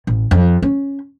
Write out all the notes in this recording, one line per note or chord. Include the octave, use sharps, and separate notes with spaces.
A1
F2
C#4